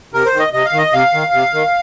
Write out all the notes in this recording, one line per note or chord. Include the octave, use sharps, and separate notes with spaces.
C3 A#4
C5
D#3
D#5
C3 D#5
F5
D#3
D#5
C3 F5
D#3
C3
D#3